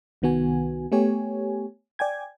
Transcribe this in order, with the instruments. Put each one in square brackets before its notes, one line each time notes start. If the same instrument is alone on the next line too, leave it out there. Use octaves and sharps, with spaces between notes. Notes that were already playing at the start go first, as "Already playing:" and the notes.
[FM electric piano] C2 D#3 B3 F#4 G#5
A3 B3 G4 C#5 G#5
D5 G5 G#5 G#6